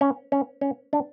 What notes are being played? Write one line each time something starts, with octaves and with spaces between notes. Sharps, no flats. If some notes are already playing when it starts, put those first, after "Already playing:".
C#4
C#4
C#4
D4